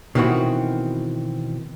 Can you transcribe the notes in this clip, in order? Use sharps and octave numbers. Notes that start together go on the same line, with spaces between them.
B2 D#3 E3 C4 F#4